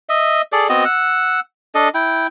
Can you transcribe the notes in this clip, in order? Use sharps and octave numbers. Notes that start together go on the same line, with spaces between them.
D#5 E5
G#4 A4 D5
B3 C4 F#4 D#5
F#5 E6
D4 A4 D#5
E4 G5